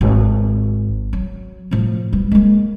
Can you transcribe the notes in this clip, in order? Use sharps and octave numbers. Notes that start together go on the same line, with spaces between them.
G#1
F#3
A2 F3
G3 B3
G#3 A#3